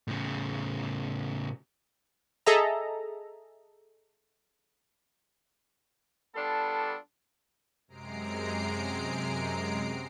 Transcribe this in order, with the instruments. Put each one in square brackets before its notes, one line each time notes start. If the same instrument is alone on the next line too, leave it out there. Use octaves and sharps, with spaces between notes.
[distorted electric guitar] A2 C#3
[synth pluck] G#4 A4 D#5 E5 A#5
[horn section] G3 B3 D4 F4 A4 A5
[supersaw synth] F#2 C3 G#3 A#5 C7 D7